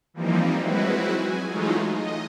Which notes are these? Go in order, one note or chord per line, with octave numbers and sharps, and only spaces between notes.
E3 F3 G3 A#3 C4 D#4
F#3 G#3 C4 E4 F#4 B4
G#5
E3 F#3 G#3 A3 D#4 F4
D#5